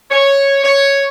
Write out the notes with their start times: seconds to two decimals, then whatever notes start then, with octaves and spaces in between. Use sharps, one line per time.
0.11 C#5
0.64 C#5